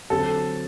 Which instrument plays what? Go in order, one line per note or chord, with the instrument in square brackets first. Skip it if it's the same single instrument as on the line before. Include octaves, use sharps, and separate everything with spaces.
[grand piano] D3 F#3 C4 [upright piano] A4